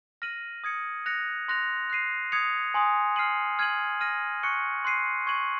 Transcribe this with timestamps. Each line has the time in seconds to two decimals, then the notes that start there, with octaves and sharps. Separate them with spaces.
0.22 F6 A#6 D#7 F#7
0.64 D#6 G#6 C#7
1.06 F#6 A#6 C#7 F7
1.48 C6 F#6 A#6 F7
1.90 F#6 C7 D#7
2.32 D#6 G#6 C#7 F7
2.74 G#5 C6 D#6
3.16 F6 C7 D#7 F#7
3.59 F6 G#6 D#7 F#7
4.01 F6 A#6 D#7
4.43 C#6 F#6 C#7
4.85 C6 F#6 C7 D#7
5.27 C#6 G#6 D#7 F#7